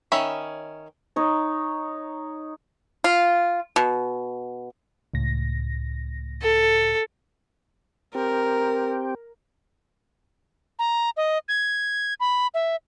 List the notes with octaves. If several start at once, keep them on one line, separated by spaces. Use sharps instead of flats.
D#3 C#4 C#5 E5 B5
D#4 C#5
F4
B2
C#2 A2 A#6
A4
C4 G4 A#4
A#5
D#5
G#6
B5
E5